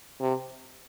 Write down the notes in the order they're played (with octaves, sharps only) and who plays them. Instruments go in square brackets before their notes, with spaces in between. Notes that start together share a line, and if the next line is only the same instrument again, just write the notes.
[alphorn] C3